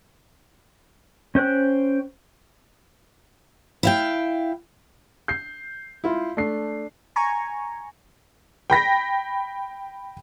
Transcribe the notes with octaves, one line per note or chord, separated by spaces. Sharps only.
C#4 C5 G5 F#6
E4 F5 G5
G6 C7
E4 F4
A3 D4 C7
G#5 A#5 C#6
G5 B5 A#6 B6